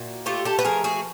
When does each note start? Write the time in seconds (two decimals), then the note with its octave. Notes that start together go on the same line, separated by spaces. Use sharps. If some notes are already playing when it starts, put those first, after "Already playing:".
Already playing: A#2 E4 F#4
0.26 A3 F4 G4
0.45 G4 A4
0.59 B4
0.65 F3 G#4 A#4
0.84 F#4 G#4